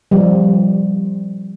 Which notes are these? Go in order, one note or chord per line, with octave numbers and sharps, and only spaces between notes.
F3 G3